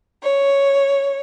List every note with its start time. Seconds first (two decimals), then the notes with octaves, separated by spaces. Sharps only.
0.22 C#5